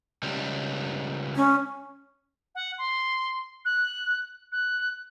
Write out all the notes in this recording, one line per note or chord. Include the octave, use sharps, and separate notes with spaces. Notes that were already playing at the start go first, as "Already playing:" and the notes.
C#2 G3
C#4
F#5
C6
F#6
F#6